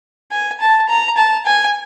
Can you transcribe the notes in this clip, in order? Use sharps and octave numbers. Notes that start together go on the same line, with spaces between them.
G#5
A5
A#5
A5
G#5